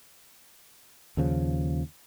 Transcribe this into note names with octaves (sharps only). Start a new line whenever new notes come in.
D#2 C#3 F3